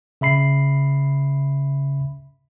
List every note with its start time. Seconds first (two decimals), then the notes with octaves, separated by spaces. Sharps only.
0.21 C#3 E5 B5 C7